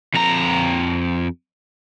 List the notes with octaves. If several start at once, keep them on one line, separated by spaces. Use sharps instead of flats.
F2 A#5